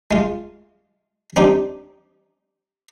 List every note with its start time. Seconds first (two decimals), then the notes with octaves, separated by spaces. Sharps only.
0.11 G#3 F4
1.36 C4 D4 D#4 G4